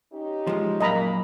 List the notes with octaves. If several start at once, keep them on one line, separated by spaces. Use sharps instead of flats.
C#4 D#4 G4
F3 G#3
F#2 A#2 A#3 D#5 A#5 B5